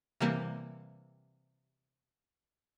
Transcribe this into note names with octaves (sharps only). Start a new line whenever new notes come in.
C3 E3 G3 A#3